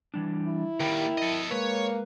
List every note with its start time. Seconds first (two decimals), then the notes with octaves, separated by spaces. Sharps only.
0.14 E3 G3 D4
0.46 E4
0.80 D#2 G3 A#4 G5
1.18 A4 D#5
1.51 G#3 A#3 B4 C#5